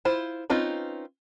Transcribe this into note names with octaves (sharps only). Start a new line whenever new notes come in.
E4 F4 C5
C4 C#4 D#4 F4 B4